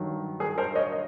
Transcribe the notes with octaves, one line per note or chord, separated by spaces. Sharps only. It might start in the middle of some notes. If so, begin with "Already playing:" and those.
Already playing: G2 D#3 F#3
G#4 A#4
A#4 C5
C#5 D#5
D#5